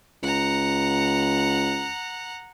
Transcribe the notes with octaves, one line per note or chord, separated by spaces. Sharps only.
C#2 F#5 A#5